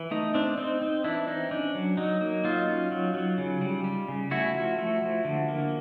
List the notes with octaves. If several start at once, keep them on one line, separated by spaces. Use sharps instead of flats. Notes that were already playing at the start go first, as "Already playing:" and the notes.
Already playing: E3
A3 D#4
C4 D4
C4 D#4
C4 D#4
E3 D4 E4
C4 D#4
C#4 D4
F#3
F#3 D#4
A#3
F#3 D#4 F4
C#4
F#3
F#3
C#3
G3
G3
C#3
A3 E4 F#4
F3
A3
F3
D3
A#3